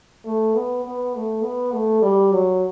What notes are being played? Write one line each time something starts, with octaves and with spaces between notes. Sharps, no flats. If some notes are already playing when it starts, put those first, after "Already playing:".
A3
B3
B3
A3
B3
A3
G3
F#3